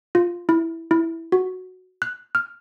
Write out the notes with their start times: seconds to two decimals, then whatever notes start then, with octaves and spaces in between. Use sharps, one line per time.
0.15 F4
0.49 E4
0.91 E4
1.32 F#4
2.02 F#6
2.35 F6